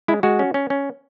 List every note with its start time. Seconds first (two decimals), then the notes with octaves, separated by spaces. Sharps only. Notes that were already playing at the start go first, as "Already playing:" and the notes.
0.08 G#3 E4
0.23 G#3 F#4
0.39 C#4
0.54 C#4
0.70 C#4